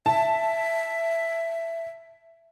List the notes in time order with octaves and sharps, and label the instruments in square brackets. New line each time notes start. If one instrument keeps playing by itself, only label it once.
[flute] E5 [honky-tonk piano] A5